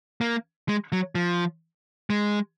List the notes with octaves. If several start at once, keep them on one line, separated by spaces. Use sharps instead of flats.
A#3
G#3
F#3
F3
G#3